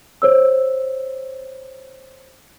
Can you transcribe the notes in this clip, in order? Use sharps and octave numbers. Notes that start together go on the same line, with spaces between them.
C5 C#5 E6